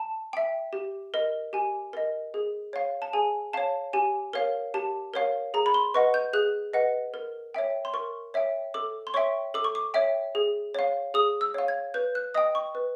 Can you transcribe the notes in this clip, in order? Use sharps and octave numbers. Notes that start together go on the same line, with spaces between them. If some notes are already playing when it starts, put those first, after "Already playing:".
Already playing: A5
E5 G5
G4
A#4 D#5
G4 G#5
A#4 D#5
G#4
C#5 F5
A5
G#4 G#5
C#5 F5 A5
G4 G#5
A#4 C#5 F5
G4 A5
A#4 C#5 F5
G#4 A#5
B5
C6
B4 D#5 F#5 C#6
G6
G#4 F#6
B4 D#5 F#5
A#4
C#5 E5 G5
C6
A#4 C#6
C#5 E5 G5
A4 D6
C6
C#5 E5 G5 C#6
A4 D6
C#6
D6
C#5 E5 G5
G#4
C#5 F5
G#4 D#6
E6
C#5 F5
G#6
B4 G6
F#6
D#5 G5 D#6
C#6
B4